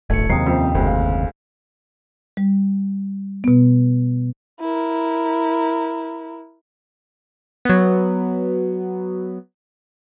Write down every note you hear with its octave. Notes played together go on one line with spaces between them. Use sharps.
D1 G1 A3 G#6 C#7
F#1 D#2 C3 A#5 D#6 C7
F2 A#3 C4 C#4 G5
F#1 D2 G#3
F5
G3
B2 B3
E4 A#4
F#3 B3